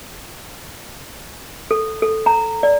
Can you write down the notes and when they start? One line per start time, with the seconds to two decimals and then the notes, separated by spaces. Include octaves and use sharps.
1.71 A4
2.02 A4
2.26 A#5
2.63 D5